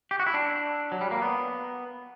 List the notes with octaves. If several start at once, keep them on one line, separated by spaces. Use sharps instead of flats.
G4
F#4
E4
D4
F#3
G3
A#3
B3